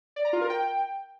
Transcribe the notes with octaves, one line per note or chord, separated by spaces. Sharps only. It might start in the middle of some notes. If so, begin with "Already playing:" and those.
D5
A#5
F4
A#4
G5